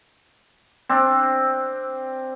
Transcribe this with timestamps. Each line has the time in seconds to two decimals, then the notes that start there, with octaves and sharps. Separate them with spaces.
0.89 C4 D4